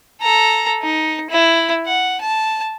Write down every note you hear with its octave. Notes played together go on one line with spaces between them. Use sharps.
A4 A#5
D#4
E4
F#5
A5